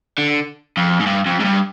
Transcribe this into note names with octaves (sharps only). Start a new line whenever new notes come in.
D3
F2
G#2
G2
F2
G#2
G2